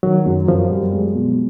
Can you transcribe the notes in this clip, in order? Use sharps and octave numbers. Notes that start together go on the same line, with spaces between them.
D#3 F#3
F#2
F#2 F3
G3
G#3
B2